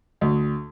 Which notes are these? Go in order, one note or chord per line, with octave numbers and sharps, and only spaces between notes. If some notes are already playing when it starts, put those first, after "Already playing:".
D2